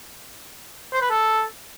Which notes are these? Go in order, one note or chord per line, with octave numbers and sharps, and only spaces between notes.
C5
B4
A4